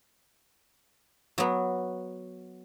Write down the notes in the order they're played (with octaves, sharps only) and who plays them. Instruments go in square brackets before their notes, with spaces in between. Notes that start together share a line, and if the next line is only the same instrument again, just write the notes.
[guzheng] F#3 B3